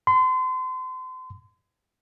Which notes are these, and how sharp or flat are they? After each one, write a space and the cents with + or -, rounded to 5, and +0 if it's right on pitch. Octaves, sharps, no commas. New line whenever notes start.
C6 -35